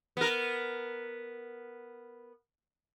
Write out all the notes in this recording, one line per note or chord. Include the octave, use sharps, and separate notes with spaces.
B3 A#4